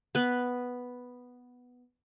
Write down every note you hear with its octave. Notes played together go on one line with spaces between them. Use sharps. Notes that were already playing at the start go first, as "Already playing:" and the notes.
B3 B4